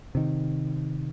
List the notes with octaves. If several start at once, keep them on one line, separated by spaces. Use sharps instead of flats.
C3 D#3